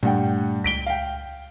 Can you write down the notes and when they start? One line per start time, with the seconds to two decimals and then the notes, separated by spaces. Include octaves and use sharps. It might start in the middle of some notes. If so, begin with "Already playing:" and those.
0.03 G2 A#2 A3 F#5 G5
0.64 C#2 B6 D7 G7
0.86 F5 G5